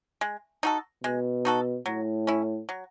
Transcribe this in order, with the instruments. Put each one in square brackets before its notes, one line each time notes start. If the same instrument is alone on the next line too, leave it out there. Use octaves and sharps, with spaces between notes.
[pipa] G#3
D#4 F#4 A4
[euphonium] B2 [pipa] G#3
[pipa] D#4 F#4 A4
[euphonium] A2 [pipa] F#3
[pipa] C#4 E4
F#3